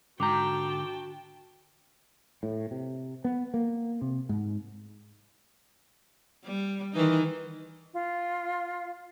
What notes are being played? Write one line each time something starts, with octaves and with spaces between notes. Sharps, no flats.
G#2 D3 F#4 G5 A5 A#5 D6 G6
A2
C3
B3
A#3
C3
G#2
G3
D#3 E3 D#4
F4